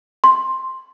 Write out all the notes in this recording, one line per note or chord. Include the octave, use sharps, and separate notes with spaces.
C6